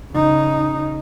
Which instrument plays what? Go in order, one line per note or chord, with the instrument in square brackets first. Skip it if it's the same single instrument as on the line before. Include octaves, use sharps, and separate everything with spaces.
[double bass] C#3 D#4